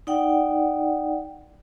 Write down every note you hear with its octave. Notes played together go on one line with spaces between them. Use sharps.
D#4 D5 F#5 G5